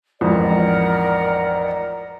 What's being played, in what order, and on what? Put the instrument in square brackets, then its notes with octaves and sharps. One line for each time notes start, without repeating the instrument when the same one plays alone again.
[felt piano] A1 F2 G#2 [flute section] A#4 D5 F#5